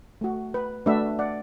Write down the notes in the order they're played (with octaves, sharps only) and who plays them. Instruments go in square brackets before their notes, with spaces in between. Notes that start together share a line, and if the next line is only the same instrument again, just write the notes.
[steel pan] A3 F#4
B4
A3 D4 F#4 B4 E5
D5 F#5